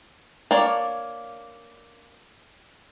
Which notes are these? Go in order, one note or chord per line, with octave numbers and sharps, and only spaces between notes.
A#3 D4 C#5